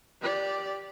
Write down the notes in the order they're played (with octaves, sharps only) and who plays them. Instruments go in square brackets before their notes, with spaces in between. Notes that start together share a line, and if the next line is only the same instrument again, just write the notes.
[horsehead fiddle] G4 D5